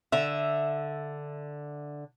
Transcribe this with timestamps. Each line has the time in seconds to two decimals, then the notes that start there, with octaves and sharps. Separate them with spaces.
0.12 D3 E5